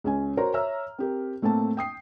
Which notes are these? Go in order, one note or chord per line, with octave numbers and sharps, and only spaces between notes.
C#2 C#4 G#5
F#4 A#4 C5 C#5 A#5
C#5 E5 A#5 E6 F6
C4 G4 A#4
A2 A3 A#3 C4 A5
G5 D#6 C7